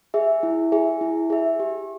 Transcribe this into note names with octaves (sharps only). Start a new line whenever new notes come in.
G#4 E5
E4
G#4 E5
E4
G#4 E5
G4